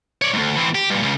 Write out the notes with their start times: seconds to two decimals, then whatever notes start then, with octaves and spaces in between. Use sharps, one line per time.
0.22 C#5 D5
0.33 D2 G#2
0.56 E3 C4
0.75 G4
0.90 G2 A#2
1.03 C#2 C#3